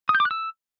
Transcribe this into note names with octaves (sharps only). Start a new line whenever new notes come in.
D#6
G6
D6
F#6
E6